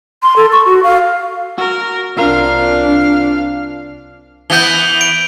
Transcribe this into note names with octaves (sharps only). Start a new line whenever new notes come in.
C6
A4
C#6
F#4
F5
F#4 A#4
C2 D4 F4 A#4 F5
E3 B3 G6 G7
D7